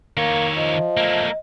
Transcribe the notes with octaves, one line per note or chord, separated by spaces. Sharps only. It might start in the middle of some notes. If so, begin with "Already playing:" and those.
D#3 A#3 C#5
F3 D#5
A3 A#3